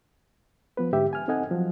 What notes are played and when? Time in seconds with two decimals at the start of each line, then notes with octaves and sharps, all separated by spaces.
0.77 F3 B3 B4
0.93 G#2 D3 G4 E5 G5
1.13 G#5 F6
1.28 C4 D#4 A4 D#5 F#5 G#5
1.51 F3 F#3